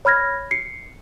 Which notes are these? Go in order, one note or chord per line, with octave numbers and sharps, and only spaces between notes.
C#5 B5 F6 G#6 A#6
C7 C#7